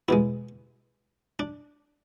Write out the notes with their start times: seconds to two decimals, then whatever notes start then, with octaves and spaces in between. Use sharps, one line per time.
0.08 E2 B2 G#3 E4
1.39 D4